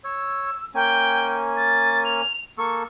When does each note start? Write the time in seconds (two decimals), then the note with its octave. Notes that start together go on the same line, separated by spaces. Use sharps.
0.04 C#5 E6
0.74 A#3 C#4 G5 G#5
1.57 A6
2.05 F7
2.58 A#3 A4 C#6